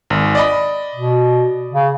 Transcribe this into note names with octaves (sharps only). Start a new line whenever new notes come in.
G#1
D5 D#5 B5
B2
C#3